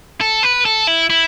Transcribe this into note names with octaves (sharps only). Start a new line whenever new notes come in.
A4
B4
A4
E4
E4